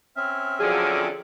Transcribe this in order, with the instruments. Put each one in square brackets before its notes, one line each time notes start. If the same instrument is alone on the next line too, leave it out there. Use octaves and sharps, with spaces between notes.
[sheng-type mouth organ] C4 C#4 E5 [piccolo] F6
[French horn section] D3 F3 F#3 [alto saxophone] G#4